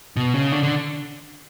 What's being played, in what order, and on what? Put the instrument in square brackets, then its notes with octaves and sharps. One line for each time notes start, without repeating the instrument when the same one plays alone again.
[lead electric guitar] B2
C#3
D3
D3